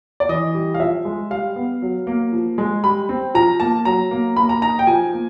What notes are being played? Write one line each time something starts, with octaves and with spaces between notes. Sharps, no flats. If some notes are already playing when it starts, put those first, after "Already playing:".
D5
E3 D#5
G3
F5
F3 E5
G#3
G3 F5
B3
F#3
A#3
F3
G#3
G3 B5
C4
F3 A#5
A#3 A5
F#3 A#5
A#3
A#3 B5
A#5
D#4 A#5
G5
F3 G#5
A#3